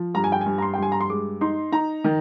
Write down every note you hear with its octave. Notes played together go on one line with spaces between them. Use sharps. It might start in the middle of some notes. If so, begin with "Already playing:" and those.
Already playing: F3
G2 A#5
G#5
G5
G2 G#5
A#5
C6
G5
G2 G#5
A#5
C6
G#3 D6
D#4 C6
D#4 A#5
D#3